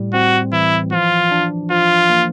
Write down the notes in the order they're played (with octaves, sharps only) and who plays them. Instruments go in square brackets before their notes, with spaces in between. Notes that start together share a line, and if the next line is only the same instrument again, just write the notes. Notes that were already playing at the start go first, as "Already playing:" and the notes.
Already playing: [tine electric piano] A2 G3
[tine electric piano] C4 [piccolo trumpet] F#4
[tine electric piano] E3 [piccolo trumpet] E4
[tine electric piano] F3 [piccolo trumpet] F4
[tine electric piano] D4
[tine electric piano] F3 [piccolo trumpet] F4
[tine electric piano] A#3